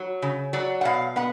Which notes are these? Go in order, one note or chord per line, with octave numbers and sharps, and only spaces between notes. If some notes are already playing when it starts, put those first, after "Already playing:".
Already playing: F#3 C#5
C#3
F#3 D5
F#5
B2 F5
B3 F#5